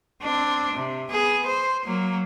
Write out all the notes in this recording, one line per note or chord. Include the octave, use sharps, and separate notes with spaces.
C4 D4
C3
B3 G#4
C5
F#3 A#3